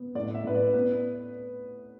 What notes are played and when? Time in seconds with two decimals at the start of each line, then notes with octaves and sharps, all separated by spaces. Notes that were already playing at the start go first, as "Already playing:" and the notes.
Already playing: B3
0.15 A2 D5
0.28 D5
0.34 E5
0.44 A2 B4
0.55 D5
0.74 B3 B4